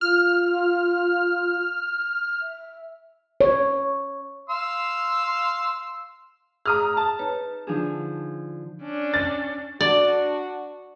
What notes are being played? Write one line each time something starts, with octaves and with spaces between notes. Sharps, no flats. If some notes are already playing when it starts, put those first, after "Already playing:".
F4 F6
E5
C#5
F5 C6 E6
G#4 A#5 D#6 F6
A5
D#4 B4 C#5 A#5
D3 F3 D4 D#4 G#4
C#4 D4
A6
D4 F#4 D5